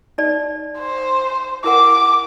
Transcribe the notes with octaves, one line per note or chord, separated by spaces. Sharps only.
D#4 D5
C5
E4 A#4 F#5 D6